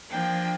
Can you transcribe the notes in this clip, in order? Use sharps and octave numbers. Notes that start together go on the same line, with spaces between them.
F3 A#3 D4 G5